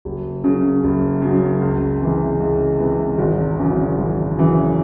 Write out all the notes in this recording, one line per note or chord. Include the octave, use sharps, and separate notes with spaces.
F#1
F#2 C#3
F#1
F#2 C#3
C#2
C3 E3 G#3
C#2
C3 E3 G#3
G#1
F#2 C#3 E3
G#1
F#2 C#3 E3